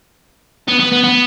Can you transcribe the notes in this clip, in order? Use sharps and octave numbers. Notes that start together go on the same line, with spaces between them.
B3
B3
B3
B3